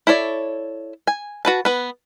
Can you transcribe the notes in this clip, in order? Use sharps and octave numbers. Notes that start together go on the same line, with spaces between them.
E4 A4 C#5 D5
G#5
F#4 B4 A5
B3 B4